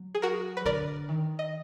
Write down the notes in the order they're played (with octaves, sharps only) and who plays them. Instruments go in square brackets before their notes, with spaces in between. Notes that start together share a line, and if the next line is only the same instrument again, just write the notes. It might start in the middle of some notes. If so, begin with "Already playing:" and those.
Already playing: [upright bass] F#3
[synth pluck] G#4
F#4 A#4
B4
[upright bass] D3 [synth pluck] A#4 D5
[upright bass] D#3
[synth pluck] D#5